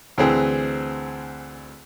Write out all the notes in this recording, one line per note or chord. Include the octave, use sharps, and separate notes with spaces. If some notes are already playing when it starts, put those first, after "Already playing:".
D2 E3 C4 G#4